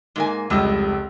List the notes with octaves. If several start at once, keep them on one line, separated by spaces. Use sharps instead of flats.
G#2 A#3 G#5
F1 C#2 G3 D#5 E6